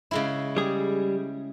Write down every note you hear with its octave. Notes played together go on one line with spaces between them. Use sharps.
C#3 G#3 E4
G3 G#4